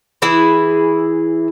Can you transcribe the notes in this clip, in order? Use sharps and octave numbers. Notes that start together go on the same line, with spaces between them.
E3 E4 G#4 B4